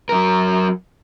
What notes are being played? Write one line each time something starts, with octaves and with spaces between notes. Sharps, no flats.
F#3 A#4